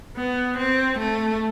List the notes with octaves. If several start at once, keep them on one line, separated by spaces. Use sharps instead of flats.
B3
C4
A3